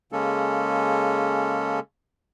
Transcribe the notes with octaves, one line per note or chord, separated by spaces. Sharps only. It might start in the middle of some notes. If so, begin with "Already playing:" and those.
C#3 G#3 A#3 C#4 A4